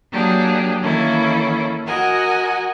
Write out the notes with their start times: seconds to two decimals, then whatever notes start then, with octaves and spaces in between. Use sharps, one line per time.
0.12 F#3 A#3 D4 G4 G#4
0.82 D#3 E3 A#3 C#4 E4 A4
1.86 F#4 A#4 D#5 F#5 G#5